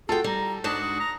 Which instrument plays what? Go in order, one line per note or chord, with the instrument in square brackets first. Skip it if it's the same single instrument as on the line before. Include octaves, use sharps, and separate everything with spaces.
[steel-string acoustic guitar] F4 G5 [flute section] F#4 G#4 [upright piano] A4
[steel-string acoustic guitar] G3 [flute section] A#5
[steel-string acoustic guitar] G#2 D4 A5 [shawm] F#4 [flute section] D6 D#6
[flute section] D#6
[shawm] A#5